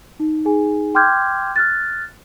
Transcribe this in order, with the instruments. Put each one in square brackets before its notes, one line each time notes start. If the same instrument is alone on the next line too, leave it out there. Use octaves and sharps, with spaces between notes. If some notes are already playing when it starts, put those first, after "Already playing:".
[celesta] D#4
D#4 G#4 G#5
G5 C6 D6 F6 G6 G#6
F6 F#6 A6